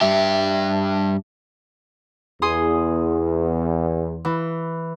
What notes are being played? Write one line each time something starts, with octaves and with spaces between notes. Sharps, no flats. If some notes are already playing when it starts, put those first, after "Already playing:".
G2 G4 E5
E2 G#4 C6 D#6
E3